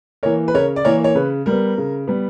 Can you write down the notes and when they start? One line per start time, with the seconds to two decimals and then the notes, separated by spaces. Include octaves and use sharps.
0.23 E3 A#3 A#4 C#5
0.48 B4
0.54 C#3 A#4 C#5
0.76 D5
0.85 E3 A#3 A#4 C#5
1.04 C#5
1.15 C#3 B4
1.46 G3 B3 A#4
1.78 C#3
2.08 G3 B3